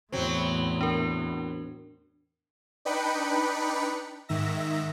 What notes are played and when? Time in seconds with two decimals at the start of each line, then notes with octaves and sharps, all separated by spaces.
0.12 E2 A2 F#3 C4
0.81 D4 A#4
2.85 D4 D#4 B4 G5 B5 C#7
4.28 G#2 D#3 E5 A#6